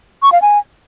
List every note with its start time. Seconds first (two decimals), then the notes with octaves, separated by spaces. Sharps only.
0.23 C#6
0.32 F5
0.42 G#5